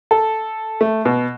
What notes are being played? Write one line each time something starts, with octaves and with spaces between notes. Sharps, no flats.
A4
A3
B2